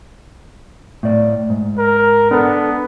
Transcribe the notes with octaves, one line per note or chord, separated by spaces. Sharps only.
A2 D5
G#2
A#4
B3 D4 A4